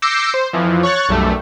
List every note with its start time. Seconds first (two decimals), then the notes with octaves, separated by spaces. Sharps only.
0.02 D6 E6 G6 A#6 C7 C#7
0.34 C5
0.53 F2 E3 F3
0.83 C#5 C#6 F#6 A6
1.09 B1 F#2 G3 A3